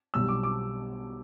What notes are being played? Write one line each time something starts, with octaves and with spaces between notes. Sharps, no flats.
B1 B2 G3 E6
D6
D6